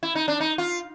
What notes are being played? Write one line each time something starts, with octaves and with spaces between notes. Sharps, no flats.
E4
D#4
D4
D#4
F4